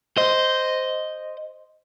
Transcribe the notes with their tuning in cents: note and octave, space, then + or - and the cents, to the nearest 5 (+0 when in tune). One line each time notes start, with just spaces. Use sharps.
C5 -5 D#5 +0